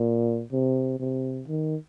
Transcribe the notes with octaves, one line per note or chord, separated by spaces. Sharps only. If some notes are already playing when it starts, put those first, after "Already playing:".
Already playing: A#2
C3
C3
D#3